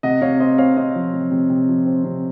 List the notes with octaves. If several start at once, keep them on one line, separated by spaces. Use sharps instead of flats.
C3 D#5 F#5
C3 C#5 F5
C4 C5 D#5
C4 C#5 F5
C4 C5 D#5
F3
C3
C3
C3
F3
C4
C3